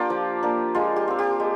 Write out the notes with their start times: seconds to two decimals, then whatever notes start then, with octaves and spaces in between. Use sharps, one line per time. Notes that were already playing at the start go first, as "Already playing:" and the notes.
Already playing: A#3 D4 F4 G4
0.10 F3
0.43 A#3 D4
0.75 G#3 F4
0.96 G4
1.08 C4 F4
1.19 G4
1.40 G#3